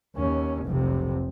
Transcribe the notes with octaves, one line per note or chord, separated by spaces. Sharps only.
D#2 C#4
F1 B1 C3